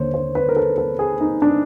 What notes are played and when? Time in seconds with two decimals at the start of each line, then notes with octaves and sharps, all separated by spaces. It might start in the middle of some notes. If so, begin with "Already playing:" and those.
Already playing: D#2 D3 C5 C#5
0.14 C5
0.35 B4
0.49 A#4
0.57 A4
0.78 A4
0.99 G#4
1.21 D#4
1.42 D4